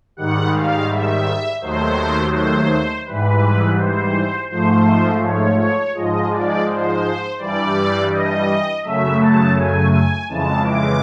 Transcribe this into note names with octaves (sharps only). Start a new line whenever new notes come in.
G#2 D#3 G3 F#5
F5
E5
D#2 D#3 F#3 A3 C5
C5
G#2 E3 G3 B4
C5
G#2 F3 A3 C5
C#5
C#5
G#2 F3 G#3 D#5
D5
C5
G2 E3 G3 D5
D#5
F#2 C#3 F#3 A3 E5
A5
G#5
G#5
F2 C#3 E3 G#3 A5
D6